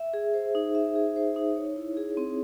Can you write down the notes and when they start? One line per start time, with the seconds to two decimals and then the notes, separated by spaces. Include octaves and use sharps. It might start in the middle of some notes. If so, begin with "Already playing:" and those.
Already playing: E5
0.14 G#4
0.34 C5
0.55 D#4
0.75 E5
0.95 G#4
1.16 C5
1.36 D#4
1.57 C#5
1.76 E4
1.97 G#4
2.17 C4